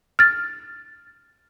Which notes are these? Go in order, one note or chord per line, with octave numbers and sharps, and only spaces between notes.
F6 A6